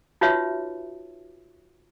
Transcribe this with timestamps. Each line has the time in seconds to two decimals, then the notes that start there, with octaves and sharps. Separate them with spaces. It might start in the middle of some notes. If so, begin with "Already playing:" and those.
0.21 D#4 F4 F#4 B4 C#5 E5